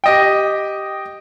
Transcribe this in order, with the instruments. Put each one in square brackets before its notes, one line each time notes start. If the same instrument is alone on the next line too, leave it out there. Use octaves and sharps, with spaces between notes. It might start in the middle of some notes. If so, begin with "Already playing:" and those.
[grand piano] G4 D#5 G5